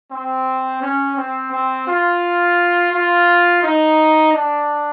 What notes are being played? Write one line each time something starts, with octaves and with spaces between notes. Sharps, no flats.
C4
C#4
C4
C4
F4
F4
D#4
D4